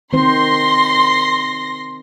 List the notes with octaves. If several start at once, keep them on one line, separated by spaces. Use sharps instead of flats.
D#3 C4 C5 C6 A#6